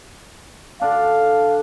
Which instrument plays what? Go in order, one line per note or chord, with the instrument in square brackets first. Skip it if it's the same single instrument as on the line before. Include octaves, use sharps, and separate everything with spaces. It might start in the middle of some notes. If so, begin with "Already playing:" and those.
[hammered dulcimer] D3 D4 [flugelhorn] F5